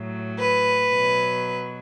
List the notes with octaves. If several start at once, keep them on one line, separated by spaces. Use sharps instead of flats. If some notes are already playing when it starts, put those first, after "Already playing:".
Already playing: A2 F#3
B4
B2 F#3